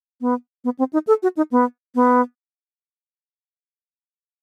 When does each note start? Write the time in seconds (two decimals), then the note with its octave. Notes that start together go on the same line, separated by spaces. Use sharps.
0.21 B3
0.64 B3
0.79 C4
0.93 D#4
1.07 A4
1.23 F#4
1.37 D#4
1.51 B3
1.95 B3